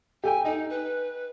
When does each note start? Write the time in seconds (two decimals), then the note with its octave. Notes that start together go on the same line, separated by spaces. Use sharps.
0.24 G4 A4 G5 G#5
0.45 D#4 D#5
0.70 B4